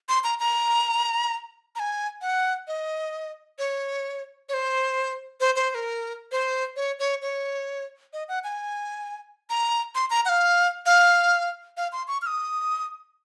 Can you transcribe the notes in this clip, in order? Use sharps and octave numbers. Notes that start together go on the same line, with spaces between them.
C6
A#5
A#5
A#5
G#5
F#5
D#5
C#5
C#5
C5
C5
C5
C5
A#4
C5
C#5
C#5
C#5
D#5
F#5
G#5
A#5
C6
A#5
F#5
F5
F5
F5
C6
C#6
F6
D#6